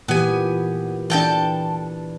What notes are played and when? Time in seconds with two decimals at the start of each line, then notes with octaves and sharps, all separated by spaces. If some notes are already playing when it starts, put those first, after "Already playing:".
0.08 A#2 E3 B3 G4 G#5
1.10 E3 D4 A4 G5 A5